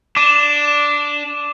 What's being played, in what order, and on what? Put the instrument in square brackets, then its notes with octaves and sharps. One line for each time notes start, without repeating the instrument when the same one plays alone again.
[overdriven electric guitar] D4 [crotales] D6 D#7 E7